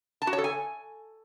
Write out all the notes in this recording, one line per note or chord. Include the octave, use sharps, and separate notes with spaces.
A5
F#4
C#5
A4
G#5